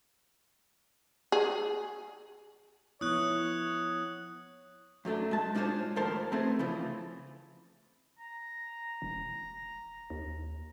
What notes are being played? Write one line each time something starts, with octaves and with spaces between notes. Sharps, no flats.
G#4
F3 B3 E4 C#5 D#6 F#6
F#2 F#3 A3 D4
G#3 A5
G#3 D4 F4 F#4 C5 C#5
D#2 A2 F3 A#4 C5 A5
A3 B3 C4 G#4
C#3 E3 F3
A#5
E1
D#2